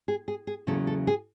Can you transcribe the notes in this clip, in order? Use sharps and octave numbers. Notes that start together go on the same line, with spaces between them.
G#4
G#4
G#4
E2 C#3 F#3 A#3 A4
A4
G#4